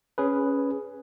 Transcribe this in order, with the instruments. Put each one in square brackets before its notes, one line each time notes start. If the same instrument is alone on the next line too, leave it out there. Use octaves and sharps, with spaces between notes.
[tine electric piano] C#4 G#4 B4